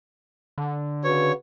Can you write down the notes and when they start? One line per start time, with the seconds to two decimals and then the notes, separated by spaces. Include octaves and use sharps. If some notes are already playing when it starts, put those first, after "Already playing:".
0.58 D3
1.04 C#3 F#4 B4 C#5